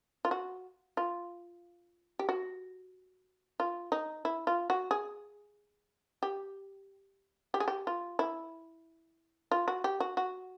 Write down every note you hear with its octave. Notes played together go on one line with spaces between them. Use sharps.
F4
F#4
F4
G4
F#4
F4
D#4
E4
F4
F#4
G#4
G4
G4
G#4
G4
F4
E4
F4
F#4
G4
F#4
F#4